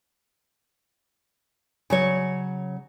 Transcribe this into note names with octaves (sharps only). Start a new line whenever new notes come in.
C#3 F#3 C#5